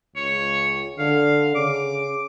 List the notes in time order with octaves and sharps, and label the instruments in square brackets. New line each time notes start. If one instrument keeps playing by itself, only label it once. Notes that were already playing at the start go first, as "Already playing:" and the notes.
[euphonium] C#2 [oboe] C#5
[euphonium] D3 [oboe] F5
[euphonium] C#3 [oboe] D6